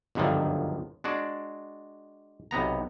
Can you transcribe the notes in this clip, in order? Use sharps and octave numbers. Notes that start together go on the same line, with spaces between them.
G1 C#2 F#2 D3 D#3 F3
G#3 D4 F#4 D5
B1 C3 B3 A#5